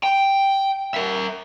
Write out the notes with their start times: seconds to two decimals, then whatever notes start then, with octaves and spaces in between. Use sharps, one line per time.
0.03 G5
0.94 A#4 E5